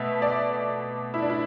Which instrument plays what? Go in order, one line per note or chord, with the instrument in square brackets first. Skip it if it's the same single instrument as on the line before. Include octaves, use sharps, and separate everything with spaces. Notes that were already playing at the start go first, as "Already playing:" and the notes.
Already playing: [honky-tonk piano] B2 A3 E5
D5
E4
D4
E4